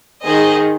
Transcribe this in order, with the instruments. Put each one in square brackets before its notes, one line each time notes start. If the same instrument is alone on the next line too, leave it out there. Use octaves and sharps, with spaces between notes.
[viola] D#3 [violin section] G#4 C5 D#5